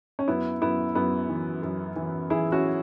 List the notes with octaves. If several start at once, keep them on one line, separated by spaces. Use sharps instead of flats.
C#4
F#2 B3 E4
F#2 B3 E4
F#2 B3 E4
E3
F#2
E3
E3 E4 G#4
C#4 F#4